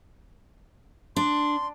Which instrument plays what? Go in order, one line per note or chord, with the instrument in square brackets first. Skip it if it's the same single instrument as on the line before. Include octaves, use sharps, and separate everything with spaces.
[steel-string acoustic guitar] D4 [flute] C6